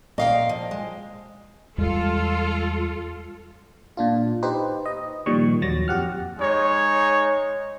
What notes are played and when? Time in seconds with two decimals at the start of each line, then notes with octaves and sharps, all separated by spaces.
0.18 A#2 D#5 F5 G5
0.49 F3
0.71 G#3
1.78 E2 G3 G#3 F4 A4
3.97 A#2 D4 F4
4.43 D#4 G4 B4 C5
4.86 D#5
5.26 A#2 D#3 F3 G3 C#6
5.62 D#2 F3 F#3 A6 A#6
5.88 F2 G4 F#5 F6
6.39 G#3 D#4 C#5